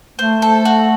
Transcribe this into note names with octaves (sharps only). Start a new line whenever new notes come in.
A3 C5
A4
F#4